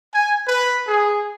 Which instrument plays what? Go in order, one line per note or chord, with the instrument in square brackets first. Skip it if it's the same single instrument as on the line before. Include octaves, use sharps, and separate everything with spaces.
[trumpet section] G#5
B4
G#4